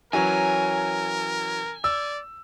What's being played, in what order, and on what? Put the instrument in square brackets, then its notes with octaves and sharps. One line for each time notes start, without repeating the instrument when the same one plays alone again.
[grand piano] E3 F#3 C#4 [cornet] A#4 [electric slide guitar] G#5
[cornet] D5 [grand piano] E6